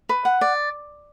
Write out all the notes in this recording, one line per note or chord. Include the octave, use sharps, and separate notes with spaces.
B4
F#5
D5